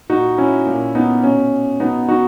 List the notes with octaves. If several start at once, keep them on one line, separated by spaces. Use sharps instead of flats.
A#2 D#4 F#4
C#4 E4
A#2
B3 D#4
B2 C#4
B2 B3 D#4
D#4 F#4